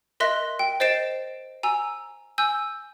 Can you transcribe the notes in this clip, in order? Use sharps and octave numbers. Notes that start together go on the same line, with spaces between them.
A#4 D#5 E5 C6 F#6 A#6
G5
C5 D#5 A6 C7 D7 E7
G#5 A#5 E6
G#5 E6 G6